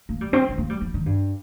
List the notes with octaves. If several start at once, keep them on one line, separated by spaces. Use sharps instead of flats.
A#3
G3
C4
C4
A#3
G3
F3
D#3
G2